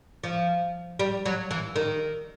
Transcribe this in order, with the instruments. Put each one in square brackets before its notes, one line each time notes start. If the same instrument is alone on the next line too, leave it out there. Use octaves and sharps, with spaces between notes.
[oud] F3
G3
F#3
E3
D#3